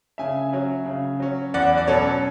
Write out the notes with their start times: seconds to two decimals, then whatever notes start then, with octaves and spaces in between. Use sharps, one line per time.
0.18 C#3 E5 G#5
0.53 F#3 C#4
0.86 C#3
1.20 F#3 C#4
1.54 E2 D5 F#5
1.78 D5
1.87 B2 F#3 C#4 A4 C#5